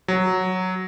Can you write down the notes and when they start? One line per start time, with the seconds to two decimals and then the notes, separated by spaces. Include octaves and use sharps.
0.08 F#3